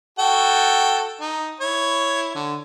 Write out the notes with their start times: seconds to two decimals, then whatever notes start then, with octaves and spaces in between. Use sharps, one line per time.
0.19 F#4 A4 G5
1.20 D#4
1.60 E4 C#5
2.35 D3